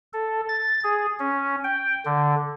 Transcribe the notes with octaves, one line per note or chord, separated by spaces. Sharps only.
A4
A6
G#4
C#4
G5
D3